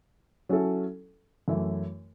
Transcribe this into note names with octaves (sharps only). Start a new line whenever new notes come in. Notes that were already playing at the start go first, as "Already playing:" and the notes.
F#3 C#4 E4 A4
F#2 E3 A3 E4